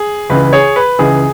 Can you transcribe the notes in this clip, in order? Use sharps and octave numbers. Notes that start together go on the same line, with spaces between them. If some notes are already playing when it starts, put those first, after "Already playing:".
Already playing: G#4
C#2 C#3 E3 B4
G#4 C#5
B4
C#2 C#3 E3 G#4